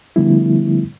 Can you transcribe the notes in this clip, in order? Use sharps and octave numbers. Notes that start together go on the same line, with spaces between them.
D3 F3 G3 A3 B3 E4